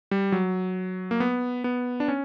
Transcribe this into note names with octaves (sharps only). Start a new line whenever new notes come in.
G3
F#3
A#3
B3
B3
D4
C#4